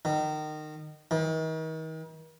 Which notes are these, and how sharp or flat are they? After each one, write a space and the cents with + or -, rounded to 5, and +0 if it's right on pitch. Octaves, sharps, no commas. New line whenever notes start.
D#3 -25
D#3 +40